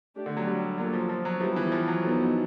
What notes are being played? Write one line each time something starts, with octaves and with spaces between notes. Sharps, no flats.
A3 D4 G4
D3
F#3
G3
F#3 A#3 D4 F4 A4
F3
F3
F#3
F3 G3 B3 E4 G4
E3
F3
F#3
B3 D#4 F#4 A4